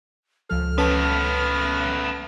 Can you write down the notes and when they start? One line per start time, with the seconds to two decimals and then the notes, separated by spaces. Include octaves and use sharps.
0.49 C#2 F3 A4 F6
0.78 A3 B3 C#4 B4 A5